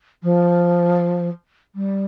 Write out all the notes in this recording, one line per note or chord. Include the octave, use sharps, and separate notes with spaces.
F3
G3